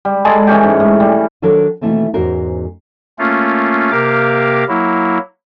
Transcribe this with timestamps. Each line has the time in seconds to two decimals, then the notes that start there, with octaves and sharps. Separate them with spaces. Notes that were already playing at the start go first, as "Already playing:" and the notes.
0.05 G3
0.25 G#3 G#4 A4 D5
0.47 E3 C#4 G4
0.63 G#2
0.80 A2
1.00 G3
1.42 D#3 F#3 D4 A4 A#4 C#5
1.81 B2 D#3 E3 A3 A#3 C4
2.14 E2 G#2 C#4 F#4 A#4 C5
3.19 A3 A#3 C#4 F4
3.91 C3 A#3 G4 A#4 F5 D6
4.68 F#3 A#3 E4